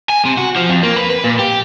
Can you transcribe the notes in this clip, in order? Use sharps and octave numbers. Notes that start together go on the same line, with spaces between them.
G#5
C3
F#4
F3
F2
A#3
B4
B4
A#2
G4